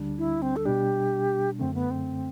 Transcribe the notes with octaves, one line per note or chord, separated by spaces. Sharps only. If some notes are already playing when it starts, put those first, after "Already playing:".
Already playing: D2 D3 G3 D4
E4
C4
A4
B2 G3 D4 G4
F#2 D3 A3 C4
B3
C4